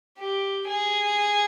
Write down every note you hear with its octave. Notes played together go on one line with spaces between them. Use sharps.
G4
G#4